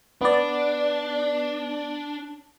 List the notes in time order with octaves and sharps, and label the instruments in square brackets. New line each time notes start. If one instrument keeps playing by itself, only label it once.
[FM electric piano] B3 D5 [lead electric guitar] D4